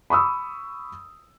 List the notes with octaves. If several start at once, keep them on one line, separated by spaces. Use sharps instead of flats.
B5 C#6 D#6 E6